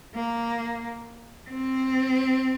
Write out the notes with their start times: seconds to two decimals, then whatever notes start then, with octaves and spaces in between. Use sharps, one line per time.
0.15 A#3
1.50 C4